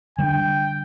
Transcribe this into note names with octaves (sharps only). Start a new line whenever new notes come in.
D3 G3 D4 G5